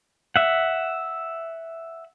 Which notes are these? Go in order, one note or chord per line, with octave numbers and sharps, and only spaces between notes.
E5 F#5